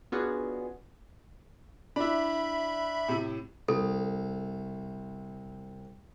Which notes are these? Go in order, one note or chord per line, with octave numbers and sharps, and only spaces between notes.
B3 C#4 D4 F4 F#4 G#4
D4 E4 E5 B5
A2 C3
C2 A4